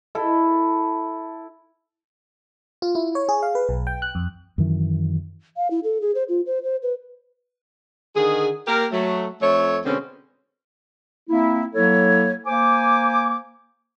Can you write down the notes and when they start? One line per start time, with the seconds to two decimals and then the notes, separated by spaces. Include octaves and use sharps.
0.15 E4 A4
2.82 F4
2.95 E4
3.15 C#5
3.29 G#4
3.43 F5
3.55 B4
3.69 B1
3.87 G5
4.02 F#6
4.15 F2
4.58 F#2 D#3 E3
5.57 F5
5.71 E4
5.84 A4
6.01 G#4
6.15 C5
6.29 F4
6.46 C5
6.64 C5
6.83 B4
8.16 D3 D#3 G#4
8.67 A#3 G4 A#4
8.92 F#3 A3
9.41 F2 A3 C#5
9.85 B2 D3 G#3 C4 C#4
11.29 A#3 C4 E4
11.74 F#3 A#3 E4 A4 C#5
12.46 A#3 C5 G#5 D6